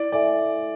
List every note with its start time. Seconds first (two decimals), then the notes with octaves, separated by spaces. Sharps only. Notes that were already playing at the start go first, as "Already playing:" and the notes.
Already playing: E4 D5
0.12 A4 D5 E5 G#5